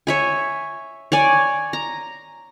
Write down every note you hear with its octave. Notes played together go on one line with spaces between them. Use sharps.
C#5 E5 G#5
C#5 D5 G#5
A#5